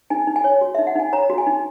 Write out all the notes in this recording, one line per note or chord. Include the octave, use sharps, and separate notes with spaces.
D#4 G#5
D#4
G#5
C#5
F#4
D#4 E5
F#5
D#4 G#5
C#5 A#5
F#4
G#5
D#4